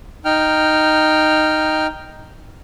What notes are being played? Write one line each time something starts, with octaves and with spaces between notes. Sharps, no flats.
D#4 G5 F6